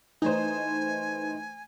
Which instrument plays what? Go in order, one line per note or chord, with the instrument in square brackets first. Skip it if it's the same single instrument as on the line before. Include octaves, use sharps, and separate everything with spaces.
[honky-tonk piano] E3 A3 C5 [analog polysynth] D#4 [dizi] G#5